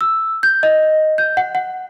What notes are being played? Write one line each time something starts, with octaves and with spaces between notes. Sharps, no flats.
E6
G6
D#5
G6
F#5
F#5